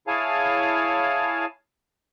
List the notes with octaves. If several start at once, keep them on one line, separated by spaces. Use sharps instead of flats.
E4 G#4 C#5 F5 G#5 A5